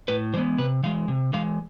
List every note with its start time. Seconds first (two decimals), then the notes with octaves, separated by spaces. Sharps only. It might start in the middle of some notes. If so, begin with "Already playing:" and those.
0.08 A2 B4
0.34 E3 G#3 B3 C5
0.58 C3 B4
0.83 E3 G#3 F5
1.08 C3
1.33 E3 G#3 F5